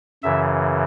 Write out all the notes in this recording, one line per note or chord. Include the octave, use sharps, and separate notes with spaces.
F#2 C#3 E3 E5